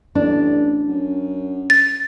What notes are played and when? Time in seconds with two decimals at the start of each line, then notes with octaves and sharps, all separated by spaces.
0.15 A1 D4
0.88 F#2
1.70 A6